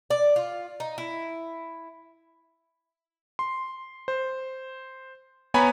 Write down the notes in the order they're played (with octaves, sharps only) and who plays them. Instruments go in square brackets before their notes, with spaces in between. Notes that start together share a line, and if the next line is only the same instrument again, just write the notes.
[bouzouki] D5
F4
D#4
E4
[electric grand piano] C6
C5
B3 C#5 G#5 A#5 B5